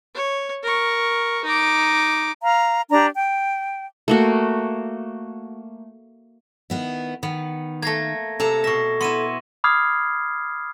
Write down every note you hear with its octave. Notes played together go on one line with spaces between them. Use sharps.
C#5
A#4 C#6
D#4 D6
F5 A#5
D4 G4 A#5
G5
A3 A#3 F#4
D#3 B3 E4
D#3 B3
A3 A#3 G#6 A#6
C3 A4 A5 A#5
B2 E5 C#6 A#6
B3 E4 C6 D#7 E7
B5 D6 D#6 F6 G#6 C7